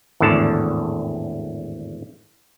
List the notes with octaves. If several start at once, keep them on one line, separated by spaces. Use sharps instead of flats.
G#1 E2 A2 D3 A5